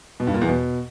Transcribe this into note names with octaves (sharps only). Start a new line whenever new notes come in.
B2
G2
A#2
E2
B2